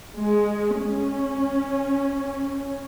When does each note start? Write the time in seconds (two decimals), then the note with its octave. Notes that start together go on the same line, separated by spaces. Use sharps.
0.19 G#3
0.79 C#4